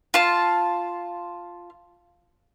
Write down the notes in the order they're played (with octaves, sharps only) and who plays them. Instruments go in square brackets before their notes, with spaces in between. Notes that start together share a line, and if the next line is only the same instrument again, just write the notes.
[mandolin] F4 A5